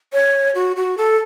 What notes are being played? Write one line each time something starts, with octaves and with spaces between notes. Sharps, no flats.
C#5
F#4
F#4
A4